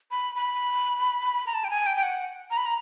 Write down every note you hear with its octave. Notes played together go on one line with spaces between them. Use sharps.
B5
B5
A#5
A5
G5
G#5
G5
G5
F#5
A#5
B5
A#5